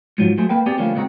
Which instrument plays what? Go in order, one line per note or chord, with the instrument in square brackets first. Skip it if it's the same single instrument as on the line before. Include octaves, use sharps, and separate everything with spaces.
[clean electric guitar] G#2 F3 F#3
F#3 A3 G#4 C5
A#3 B4 G5
B3 C4 G4 G#4 D5
D3 F3 G3 A3 A#3 C#4
C#2 C#3 B3 C4 D#4 F#4